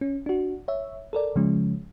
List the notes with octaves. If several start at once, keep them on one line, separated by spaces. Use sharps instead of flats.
C#4
D4 F#4
C#5 E5
A4 A#4 D5
C#3 F3 G#3 C#4